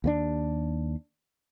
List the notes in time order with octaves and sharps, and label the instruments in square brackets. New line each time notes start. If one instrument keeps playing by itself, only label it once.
[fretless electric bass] D#2 A#3 D4